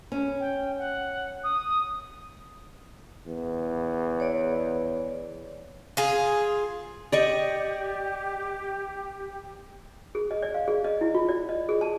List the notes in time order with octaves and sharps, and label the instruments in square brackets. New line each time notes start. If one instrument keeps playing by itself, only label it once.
[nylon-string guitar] C#4
[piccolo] G5
F#5
D#6
[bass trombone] E2
[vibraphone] C#5 D5
[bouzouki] F4 G#4
[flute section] G4 [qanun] D5 D#5 C#6
[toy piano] G#4
D#5
D5
F5
G#4
D#5
E4
F4
D5
D#5
G#4
A5